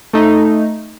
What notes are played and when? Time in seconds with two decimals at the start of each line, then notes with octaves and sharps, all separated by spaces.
0.13 A3 D#4